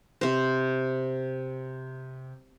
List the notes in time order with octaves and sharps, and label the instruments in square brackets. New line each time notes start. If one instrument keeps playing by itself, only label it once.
[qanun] C3 C5